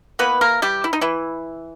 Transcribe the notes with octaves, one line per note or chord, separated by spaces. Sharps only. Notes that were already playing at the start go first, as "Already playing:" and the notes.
E3 A#3 B3 B4
A#3 A#4
G3 G4
E4
D#4
E3 E4